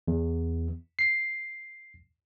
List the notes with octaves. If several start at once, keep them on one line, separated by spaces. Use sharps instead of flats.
E2
C7